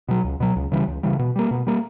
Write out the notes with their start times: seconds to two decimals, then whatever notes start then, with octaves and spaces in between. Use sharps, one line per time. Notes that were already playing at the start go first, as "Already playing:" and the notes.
0.09 B2 F#3
0.24 C#2
0.40 B2 F#3
0.56 C#2
0.72 C#3 E3 G3
0.88 C#2
1.03 C#3 E3 G3
1.19 B2
1.36 G3 A#3
1.51 B2
1.67 G3 A#3